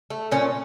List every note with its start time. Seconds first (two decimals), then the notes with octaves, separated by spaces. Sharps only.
0.10 A3
0.31 A#2 C#4